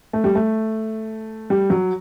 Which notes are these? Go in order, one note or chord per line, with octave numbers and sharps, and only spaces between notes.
A3
G3
A3
G3
F#3